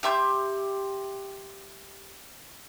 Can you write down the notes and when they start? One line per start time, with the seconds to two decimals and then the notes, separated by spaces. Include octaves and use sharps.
0.03 G4 E5 C6 G6